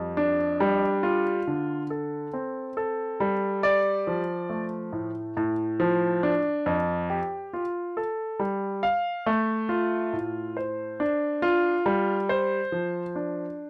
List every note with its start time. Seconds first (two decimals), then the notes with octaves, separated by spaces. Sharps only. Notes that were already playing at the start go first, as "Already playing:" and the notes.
Already playing: F2 G3
0.17 D4
0.60 G3
1.03 F4
1.47 D3
1.90 A4
2.33 C4
2.77 A4
3.20 G3
3.63 D5
4.07 F3
4.50 A3
4.93 A2
5.37 A2
5.80 F3
6.23 D4
6.66 F2
7.10 G4
7.53 F4
7.97 A4
8.39 G3
8.83 F5
9.26 A3
9.69 F4
10.13 A2
10.57 C5
11.00 D4
11.42 F4
11.86 G3
12.29 C5
12.72 F3
13.16 D4